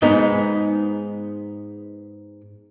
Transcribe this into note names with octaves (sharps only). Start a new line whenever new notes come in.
G#2 G#3 B3 D#4